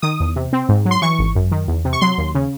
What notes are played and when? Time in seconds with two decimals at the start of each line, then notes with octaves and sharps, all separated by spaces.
0.02 D#3 D#6
0.20 E2
0.36 C3
0.53 C4
0.69 G#2
0.85 F#3
0.91 C6
1.02 E3 C#6
1.19 G#1
1.35 F#2
1.51 D#3
1.68 E2
1.85 C3
1.93 C#6
2.01 F#3 C6
2.18 D#2
2.35 C#3